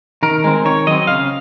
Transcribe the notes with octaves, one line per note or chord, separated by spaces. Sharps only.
D#3 A#4
G#3 C4
D#3 C#5
F#3 C4 D#5
C#3 F5